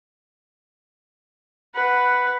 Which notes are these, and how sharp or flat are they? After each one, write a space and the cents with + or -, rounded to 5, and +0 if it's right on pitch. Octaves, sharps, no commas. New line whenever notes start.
B4 +5 F#5 +0